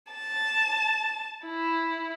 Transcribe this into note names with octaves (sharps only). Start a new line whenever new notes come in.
A5
E4